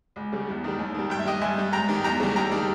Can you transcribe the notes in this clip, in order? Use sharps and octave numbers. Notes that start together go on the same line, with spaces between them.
C#2
C#3 G3
E2
D#3 G3
D#2
D#3 G3
G2 G5
E5
G3 D#5 G5
G2 E5 G#5
G3
G#2 G5 A#5
D#3 G3
E2 G5 A#5
C#3 G3
D#2 G5 A#5
D#3 G3